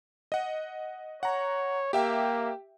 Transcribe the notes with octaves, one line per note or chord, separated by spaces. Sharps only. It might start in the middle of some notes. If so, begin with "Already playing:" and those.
D#5 F#5
C#5 F#5 A#5
A#3 G4 E5 G5